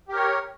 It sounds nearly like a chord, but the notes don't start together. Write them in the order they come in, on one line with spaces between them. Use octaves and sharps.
G4 A#4 C#5